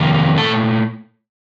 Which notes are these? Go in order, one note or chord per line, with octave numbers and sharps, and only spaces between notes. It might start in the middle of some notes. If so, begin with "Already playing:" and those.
Already playing: F2 C3 D#3 A#3
A#2 A3 A4